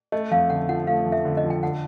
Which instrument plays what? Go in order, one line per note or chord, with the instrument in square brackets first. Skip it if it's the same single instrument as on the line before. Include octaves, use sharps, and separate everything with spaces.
[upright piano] A3 [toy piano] D#5
[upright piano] F2 [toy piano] F5
[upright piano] D3 [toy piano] F#5
[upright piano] F3 [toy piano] F#5
[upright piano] A3 [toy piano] F5
[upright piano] F2
[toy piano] E5
[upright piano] D3
[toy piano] D#5
[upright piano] F3
[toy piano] G5
[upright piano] D3 [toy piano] F#5